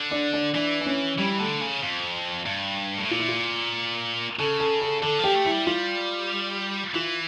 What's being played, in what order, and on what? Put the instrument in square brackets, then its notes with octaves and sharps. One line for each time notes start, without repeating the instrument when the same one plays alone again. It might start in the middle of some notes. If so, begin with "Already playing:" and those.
Already playing: [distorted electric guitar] D3
[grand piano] D4
D4
[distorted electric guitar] E3 [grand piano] D4
[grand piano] D4
C#4
[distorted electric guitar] E3 [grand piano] G3
[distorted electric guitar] D3 [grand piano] A3
[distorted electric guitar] C#3
F2
G2
A2
[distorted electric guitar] A#2 [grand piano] F4
[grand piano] E4
F4
[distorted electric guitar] C#3 [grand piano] A4
[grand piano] A4
A4
[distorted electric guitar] D3 [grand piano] A4
[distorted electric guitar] F3 [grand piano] G4
[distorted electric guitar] A3
[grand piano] E4
[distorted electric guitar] G3
[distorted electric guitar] G3 [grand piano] F4
[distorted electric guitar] E3 [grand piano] F4